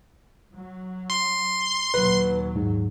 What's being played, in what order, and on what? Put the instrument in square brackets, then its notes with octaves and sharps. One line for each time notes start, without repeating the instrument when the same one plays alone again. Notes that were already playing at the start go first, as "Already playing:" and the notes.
[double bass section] F#3
[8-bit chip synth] C6
[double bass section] D#2 A#2 F#3 [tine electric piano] B4
[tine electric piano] G#2